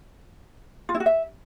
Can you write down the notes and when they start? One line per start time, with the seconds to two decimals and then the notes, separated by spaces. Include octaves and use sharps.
0.89 F4
0.95 E4
1.00 F#4
1.06 E5